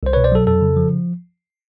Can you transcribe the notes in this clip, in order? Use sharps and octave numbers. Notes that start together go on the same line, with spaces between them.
C2 C5
B2 B4 C#5
C5 D5
F#3 A4
F2 A4
C#3
F3